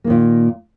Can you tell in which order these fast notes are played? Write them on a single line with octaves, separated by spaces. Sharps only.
A#3 D#3 A#2